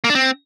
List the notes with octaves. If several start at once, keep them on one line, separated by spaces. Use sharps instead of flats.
A#3
D4
C4